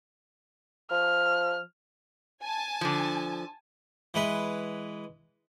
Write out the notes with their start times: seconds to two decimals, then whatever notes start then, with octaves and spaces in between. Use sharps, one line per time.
0.91 F3 F6
2.41 G#5 A5
2.81 D3 F3
4.14 E3 G#3 B4